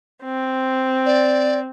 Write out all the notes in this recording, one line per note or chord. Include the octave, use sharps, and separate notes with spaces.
C4
D5